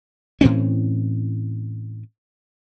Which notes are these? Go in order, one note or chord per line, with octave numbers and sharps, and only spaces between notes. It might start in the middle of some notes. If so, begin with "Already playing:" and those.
A2 E3 C4 C#4